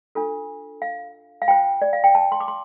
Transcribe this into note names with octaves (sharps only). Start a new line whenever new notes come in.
D4 F4 A4
F5
F5
F4 C5 G5
D5
F5
G5
A5
C6
D6
C6